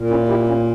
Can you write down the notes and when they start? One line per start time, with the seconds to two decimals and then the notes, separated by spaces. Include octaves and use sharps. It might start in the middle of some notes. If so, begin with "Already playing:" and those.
Already playing: A#2
0.10 C#4 E4
0.28 E4 G4
0.47 A#3 C#4